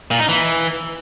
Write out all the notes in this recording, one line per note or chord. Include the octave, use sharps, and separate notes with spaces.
A#2
D#4
E3